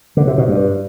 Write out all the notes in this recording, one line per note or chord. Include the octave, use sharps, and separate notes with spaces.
D3
C3
B2
G2